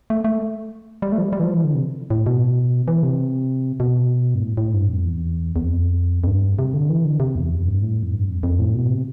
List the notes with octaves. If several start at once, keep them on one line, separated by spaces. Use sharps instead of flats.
A3
A3
G3
A3
F3
G3
G3
E3
F3
E3
D3
C3
A2
B2
E3
C3
B2
G2
A2
A2
G2
F2
E2
E2
F2
F2
G2
C3
D3
E3
D3
C3
E2
F2
G2
A2
F2
G2
F2
F2
A2
B2
C3